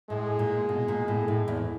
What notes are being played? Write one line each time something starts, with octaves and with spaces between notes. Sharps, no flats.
A2 G#3
A#2
B2
A#2
A2
A2
E2